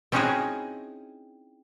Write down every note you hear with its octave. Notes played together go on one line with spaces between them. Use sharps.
C4 C#4 D#4 E4 F#4 G#4